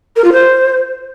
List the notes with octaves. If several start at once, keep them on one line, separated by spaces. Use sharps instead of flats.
A#4
F4
C5